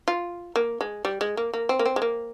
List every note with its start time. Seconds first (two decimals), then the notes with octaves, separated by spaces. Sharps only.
0.08 F4
0.56 A#3
0.81 G#3
1.05 G3
1.21 G#3
1.37 A#3
1.53 A#3
1.69 C4
1.79 A#3
1.86 C4
1.96 G#3
2.02 A#3